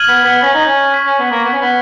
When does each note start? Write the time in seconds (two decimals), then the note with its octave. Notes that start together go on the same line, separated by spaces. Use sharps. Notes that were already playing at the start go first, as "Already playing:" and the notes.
Already playing: F6 G#6 D#7 F#7
0.08 B3
0.25 B3
0.42 C#4
0.54 D#4
0.66 C#4
0.93 C#6 F6 B6
1.06 C#4
1.19 B3
1.31 A#3
1.44 B3
1.53 C#4
1.61 B3